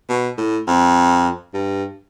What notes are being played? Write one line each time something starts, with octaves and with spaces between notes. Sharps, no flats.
B2
A2
F2
G2